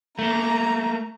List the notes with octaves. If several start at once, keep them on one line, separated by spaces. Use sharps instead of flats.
A3 A#3 A#5